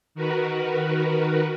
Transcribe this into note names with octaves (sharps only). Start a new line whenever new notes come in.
D#3 F#4 A#4 B4